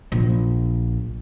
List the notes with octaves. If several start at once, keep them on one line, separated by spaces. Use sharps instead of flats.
A#1